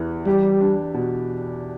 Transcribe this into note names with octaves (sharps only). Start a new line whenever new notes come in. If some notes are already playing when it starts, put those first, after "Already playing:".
Already playing: E2 E3 G4
G3 G4
D4
B2